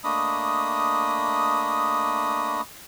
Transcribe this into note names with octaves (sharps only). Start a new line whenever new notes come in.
A3 A#3 D4 D#5 B5 D#6